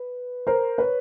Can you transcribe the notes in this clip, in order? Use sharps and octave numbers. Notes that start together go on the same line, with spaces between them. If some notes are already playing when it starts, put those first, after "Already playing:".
Already playing: B4
A#4 C5
B4 C#5